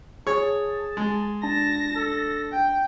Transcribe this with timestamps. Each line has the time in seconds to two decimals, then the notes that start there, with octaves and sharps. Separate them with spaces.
0.27 G#4 C#5 A5 C#6
0.97 G#3
1.43 D4 A5 A#6
1.96 A4
2.52 G5